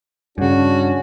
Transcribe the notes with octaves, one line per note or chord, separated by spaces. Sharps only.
G2 C#3 C#4 D4 F#4